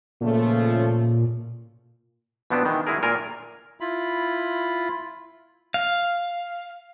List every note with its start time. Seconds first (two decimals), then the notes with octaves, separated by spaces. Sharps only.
0.21 A#2 C#3 F3 A3
2.50 B2 F3 B3 C4 D4 D#4
2.66 D#3 E3
2.87 D#3 G#3 E4 F#4 G#4 A#4
3.03 A#2 F4 A#4 G#5
3.81 E4 F4 B5
5.74 F5